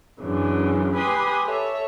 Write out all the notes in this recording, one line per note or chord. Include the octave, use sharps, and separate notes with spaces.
F#2 C#3 E3 D4
G4 B4 G#5 B5 C6 D#6
A4 C#5 E5